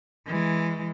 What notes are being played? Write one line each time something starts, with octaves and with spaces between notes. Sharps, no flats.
E3 G#3